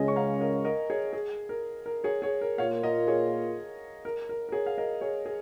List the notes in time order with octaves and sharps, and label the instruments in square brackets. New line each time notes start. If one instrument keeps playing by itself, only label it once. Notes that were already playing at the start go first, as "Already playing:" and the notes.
Already playing: [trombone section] C#2 C#3 G#3 C#4 [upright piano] D#5 G#5
[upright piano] C#6
F5 A#5
A#4 D#5
A#4 D#5
G#4 C#5
G#4
A#4
A#4
G#4 C#5
G#4 C#5
A#4
[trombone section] A#2 A#3 F4 [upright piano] C#5 F5
[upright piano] A#4 D#5
G#4 C#5
A#4
A#4
A#4
G#4 C#5
F5
A#4 D#5
G#4 C#5
G#4